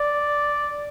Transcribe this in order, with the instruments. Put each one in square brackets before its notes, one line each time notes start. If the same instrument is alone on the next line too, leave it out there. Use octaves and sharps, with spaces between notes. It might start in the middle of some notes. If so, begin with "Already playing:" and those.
Already playing: [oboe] D5